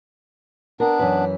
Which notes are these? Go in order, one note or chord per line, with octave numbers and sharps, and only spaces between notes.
B3 D4 A#4
F#2 E3 B4